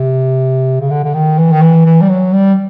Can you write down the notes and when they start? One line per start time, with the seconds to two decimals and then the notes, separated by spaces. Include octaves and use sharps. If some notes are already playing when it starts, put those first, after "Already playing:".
Already playing: C3
0.80 C#3
0.90 D3
1.04 D3
1.14 D#3
1.38 E3
1.52 D#3
1.62 E3
1.86 E3
2.01 G3
2.09 F#3
2.33 G3